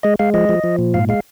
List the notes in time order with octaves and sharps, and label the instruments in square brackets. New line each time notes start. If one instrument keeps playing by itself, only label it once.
[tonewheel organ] G#3 D#5
G#3 F5
F3 D#5
F3
F3
A#2
G#2 F5
G#3 F5